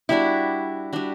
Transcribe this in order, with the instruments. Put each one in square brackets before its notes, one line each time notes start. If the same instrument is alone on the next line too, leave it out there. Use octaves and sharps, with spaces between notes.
[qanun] G3 D4 F#4 [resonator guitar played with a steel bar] E4
[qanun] G3 D4 F#4